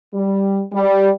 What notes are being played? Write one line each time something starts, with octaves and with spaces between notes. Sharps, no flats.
G3
G3